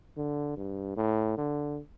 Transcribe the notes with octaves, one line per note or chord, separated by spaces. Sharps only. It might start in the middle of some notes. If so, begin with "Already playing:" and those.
D3
G2
A2
D3